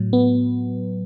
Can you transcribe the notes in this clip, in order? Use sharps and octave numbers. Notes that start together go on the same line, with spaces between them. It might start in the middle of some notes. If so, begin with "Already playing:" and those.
Already playing: A2 F#3
B3